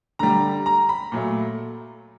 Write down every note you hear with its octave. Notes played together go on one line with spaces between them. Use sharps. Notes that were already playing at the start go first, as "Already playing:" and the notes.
D3 G3 A#5
A#5
B5
A#2 F#3 A3